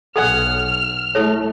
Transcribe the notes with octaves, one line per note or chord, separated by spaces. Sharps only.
B1 F#4 G#4 A4 F#5 F6
A3 E4 A4 C#5